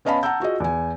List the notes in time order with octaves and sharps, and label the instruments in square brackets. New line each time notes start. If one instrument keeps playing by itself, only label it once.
[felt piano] B3 C#4 D#5 F5 A5 B5
F#5 A5 A#5 E6 G6
F4 F#4 G#4 D#5
E2 G#5